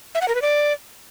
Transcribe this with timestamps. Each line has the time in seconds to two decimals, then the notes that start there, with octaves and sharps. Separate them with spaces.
0.15 E5
0.22 F#5
0.28 A#4
0.35 B4
0.42 D5